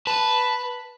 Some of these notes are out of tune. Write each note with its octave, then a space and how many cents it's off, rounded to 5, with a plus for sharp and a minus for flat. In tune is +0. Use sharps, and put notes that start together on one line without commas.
B4 +0 A5 +0